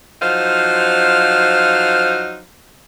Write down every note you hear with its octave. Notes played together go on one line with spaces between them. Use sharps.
F3 F#3 D#4 C5 F5